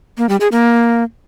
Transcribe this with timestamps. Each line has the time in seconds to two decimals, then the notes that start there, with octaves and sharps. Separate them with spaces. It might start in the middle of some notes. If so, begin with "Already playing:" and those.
0.18 A#3
0.29 G3
0.40 G#4
0.52 A#3